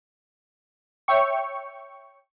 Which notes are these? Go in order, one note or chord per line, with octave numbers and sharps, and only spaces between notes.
C#5 E5 G5 C#6